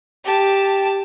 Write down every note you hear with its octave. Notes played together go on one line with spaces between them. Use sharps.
G4 A5